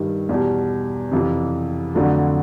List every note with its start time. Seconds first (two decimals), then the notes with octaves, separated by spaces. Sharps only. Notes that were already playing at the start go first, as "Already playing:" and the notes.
Already playing: G2 D#3 G3
0.29 E2 B2 G3
1.12 F2 C3 E3
1.95 F2 D3 F#3 A3 D4